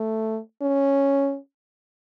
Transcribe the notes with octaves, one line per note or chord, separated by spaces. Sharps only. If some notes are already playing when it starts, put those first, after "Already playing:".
Already playing: A3
C#4